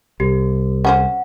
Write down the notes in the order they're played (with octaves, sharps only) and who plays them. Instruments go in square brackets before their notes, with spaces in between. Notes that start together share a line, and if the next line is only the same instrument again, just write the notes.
[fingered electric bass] C2 [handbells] G4
[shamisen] C#4 G#4 C5 [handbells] F#5